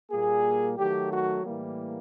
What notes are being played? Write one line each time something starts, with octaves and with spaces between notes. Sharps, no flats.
A#2 G3 A#3 G#4
D#3 F#3 A3 G4
F#4
A2 E3 G3 A#3